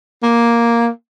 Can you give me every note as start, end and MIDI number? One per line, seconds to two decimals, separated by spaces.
0.23 0.88 58